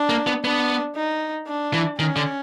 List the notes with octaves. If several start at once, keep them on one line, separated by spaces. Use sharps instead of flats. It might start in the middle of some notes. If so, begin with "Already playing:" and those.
Already playing: D4
A#3
B3
B3 D4
D#4
D4
E3
D#3 C#4
D3